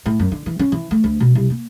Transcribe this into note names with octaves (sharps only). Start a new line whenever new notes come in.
A2
F#2
D3
E3
C#4
E3
A3
D2
B2
C2
A#3